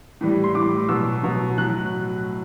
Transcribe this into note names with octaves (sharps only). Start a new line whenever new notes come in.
A2 E3 G3
C6
A2 E3 G3 D6
B2 F#3 E6
B2 F#3
A2 F#3 F#6